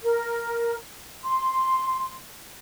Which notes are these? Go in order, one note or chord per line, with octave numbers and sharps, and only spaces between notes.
A#4
C6